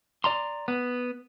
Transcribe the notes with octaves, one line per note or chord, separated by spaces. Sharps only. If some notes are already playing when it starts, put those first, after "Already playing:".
D5 A#5 C6
B3